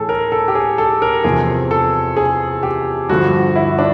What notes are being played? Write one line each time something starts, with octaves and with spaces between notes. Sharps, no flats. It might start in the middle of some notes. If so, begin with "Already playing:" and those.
Already playing: A2 E3 G#4 A4
A#4
A4
G4
G#4
A4
A#4
E2 C3 F3 G#4
A4
G#4
G4
G2 D3 F3 F#4
E4
D4